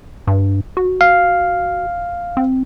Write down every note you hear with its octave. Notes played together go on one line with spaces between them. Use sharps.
G2
F#4
F5
C4